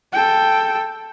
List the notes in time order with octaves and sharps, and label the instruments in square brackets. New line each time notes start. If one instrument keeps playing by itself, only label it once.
[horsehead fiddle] A4 G5